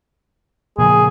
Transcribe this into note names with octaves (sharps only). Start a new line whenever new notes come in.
A#2 C#3 F3 G#4